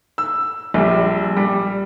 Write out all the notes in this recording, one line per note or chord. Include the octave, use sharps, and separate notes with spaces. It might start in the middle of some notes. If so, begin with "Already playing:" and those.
E6
A#1 G3
G3